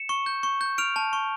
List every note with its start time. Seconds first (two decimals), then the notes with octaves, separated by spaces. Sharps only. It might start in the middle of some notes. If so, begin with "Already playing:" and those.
Already playing: C#7 E7
0.09 C#6
0.26 G6
0.43 C#6
0.61 G6
0.78 F6 D7 F7
0.96 A5
1.13 C#6